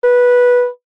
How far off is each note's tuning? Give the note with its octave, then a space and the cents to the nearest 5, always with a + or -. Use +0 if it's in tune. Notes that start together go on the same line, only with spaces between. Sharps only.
B4 -10